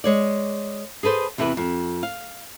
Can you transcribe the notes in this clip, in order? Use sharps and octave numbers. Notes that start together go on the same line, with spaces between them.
G#3 C#5 D5
G#4 A4 B4 C5
E2 C3 E4 G4 B4
F2
F5